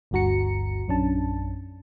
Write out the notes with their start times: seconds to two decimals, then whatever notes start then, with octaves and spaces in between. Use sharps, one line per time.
0.11 G1 D2 G2 F#4 A#5 C#7
0.88 A#1 F#2 C#4 D4 A5